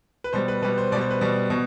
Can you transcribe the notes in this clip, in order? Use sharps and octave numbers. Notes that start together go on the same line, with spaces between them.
B4
B2 G3 C5
B4
B2 G3 B4
C5
B2 G3 D5
C5
B4
B2 G3
B2